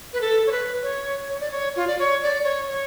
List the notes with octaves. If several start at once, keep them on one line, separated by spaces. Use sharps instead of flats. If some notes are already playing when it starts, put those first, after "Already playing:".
B4
A4
C#5
B4
C#5
C#5
D5
C#5
F4
D5
C#5
D5
C#5
C#5